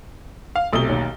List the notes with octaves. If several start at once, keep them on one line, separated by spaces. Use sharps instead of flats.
F5
B1 C3 A3 D#6 G7
D#2 C#5